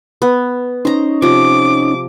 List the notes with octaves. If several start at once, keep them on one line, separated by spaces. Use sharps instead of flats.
B3
C#4 D#4 C5 A#5
C3 F3 D6